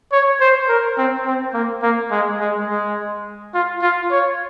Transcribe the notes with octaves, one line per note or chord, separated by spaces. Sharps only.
C#5
C5
A#4
C4
C4
A#3
A#3
G#3
G#3
G#3
F4
F4
C#5